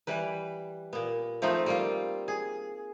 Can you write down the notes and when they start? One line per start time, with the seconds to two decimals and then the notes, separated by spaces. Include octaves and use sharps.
0.07 E3 G3 B4
0.93 A#2 B3
1.42 F3 A3 C4 D#4 F4 C5
1.66 G3 A#3 F4
2.28 G#4